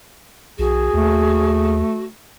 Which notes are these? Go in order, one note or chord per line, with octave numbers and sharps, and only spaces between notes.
B1 F#4 G#4
D#2 A3